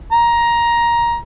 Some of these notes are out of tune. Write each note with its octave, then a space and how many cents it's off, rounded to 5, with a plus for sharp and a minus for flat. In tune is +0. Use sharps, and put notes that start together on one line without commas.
A#5 +15